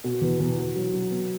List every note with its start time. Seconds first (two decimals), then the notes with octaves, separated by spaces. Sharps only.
0.04 B2
0.21 E2
0.40 E2
0.58 F#4
0.76 F#3
0.93 F#3
1.11 B3